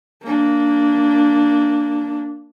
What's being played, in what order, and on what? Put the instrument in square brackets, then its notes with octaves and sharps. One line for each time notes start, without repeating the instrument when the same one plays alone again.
[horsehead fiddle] A#3 D4